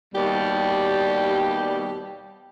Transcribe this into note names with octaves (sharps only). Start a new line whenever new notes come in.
D#2 B2 G3 G4